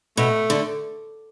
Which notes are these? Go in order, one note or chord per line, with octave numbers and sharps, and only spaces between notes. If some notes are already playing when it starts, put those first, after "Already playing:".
B2 A3
D3